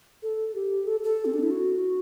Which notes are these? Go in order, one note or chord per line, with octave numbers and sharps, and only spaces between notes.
A4
G4
A4
A4
C4
D4
E4
F#4